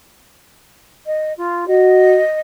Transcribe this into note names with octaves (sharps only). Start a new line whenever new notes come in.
D#5
F4
F#4 D#5